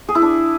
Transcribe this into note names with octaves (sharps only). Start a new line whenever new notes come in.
G#4
E4
D4